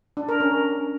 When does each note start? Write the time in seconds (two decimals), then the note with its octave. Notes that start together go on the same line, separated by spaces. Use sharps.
0.17 D4
0.29 A#4
0.40 C#4